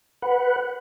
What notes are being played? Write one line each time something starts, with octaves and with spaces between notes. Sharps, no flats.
B4 F#5